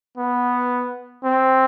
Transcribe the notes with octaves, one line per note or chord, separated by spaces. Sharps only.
B3
C4